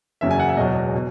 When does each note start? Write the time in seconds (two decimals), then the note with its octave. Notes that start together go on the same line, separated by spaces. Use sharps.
0.21 F#1 E2 C#3 F#3 E5
0.31 G#5
0.40 F#5
0.49 E5
0.57 E1 E2 B2 F#3 D#5
0.95 B2